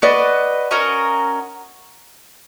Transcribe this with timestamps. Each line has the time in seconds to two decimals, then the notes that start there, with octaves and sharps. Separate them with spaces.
0.02 F#4 B4 D5 D#5
0.71 C#4 F#4 A#4 D#5